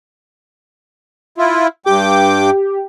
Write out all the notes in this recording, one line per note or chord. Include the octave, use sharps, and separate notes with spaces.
E4 F4
G2 G4 G5 D6